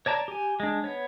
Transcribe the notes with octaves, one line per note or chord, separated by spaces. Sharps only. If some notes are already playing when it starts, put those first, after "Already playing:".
C#5 D5 A5 A#5
G4 G#5
G#3 D4
B3 C#5